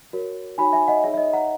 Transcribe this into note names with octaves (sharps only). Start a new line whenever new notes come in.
F#4 A#4 C#5
D#4 F#4 C#5 G#5 B5
E5 G#5
D#5 F#5
D#4 G#4 C#5 E5
E5
D#5
F#5 A#5